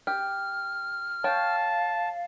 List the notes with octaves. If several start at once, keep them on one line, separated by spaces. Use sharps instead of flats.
G4 F6
C#5 F5 G5 A5